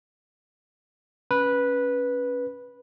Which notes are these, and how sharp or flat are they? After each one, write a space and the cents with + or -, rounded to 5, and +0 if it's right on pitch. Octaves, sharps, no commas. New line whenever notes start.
C#4 +0 B4 -10